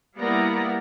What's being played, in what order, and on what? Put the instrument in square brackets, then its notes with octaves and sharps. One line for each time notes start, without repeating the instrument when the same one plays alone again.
[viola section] G3 A#3 B3 E4 D5 A#5